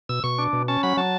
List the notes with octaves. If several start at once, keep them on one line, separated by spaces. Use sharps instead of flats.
B2 E6
B2 C#6
D4
B2
C#4 A5
F#3 B5
F#3 A5